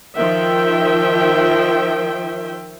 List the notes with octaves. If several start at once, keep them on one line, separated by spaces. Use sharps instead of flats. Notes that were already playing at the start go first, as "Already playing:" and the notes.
D#3 F3 E5 G5